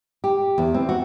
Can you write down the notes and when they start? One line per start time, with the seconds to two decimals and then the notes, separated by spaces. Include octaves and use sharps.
0.24 G4
0.58 E2
0.74 C4
0.89 F#4